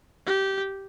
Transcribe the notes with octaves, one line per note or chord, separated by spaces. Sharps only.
G4